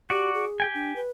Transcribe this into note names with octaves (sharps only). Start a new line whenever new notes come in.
F#4 G4 D5
G#4
G4 G5 G#5
D4
B4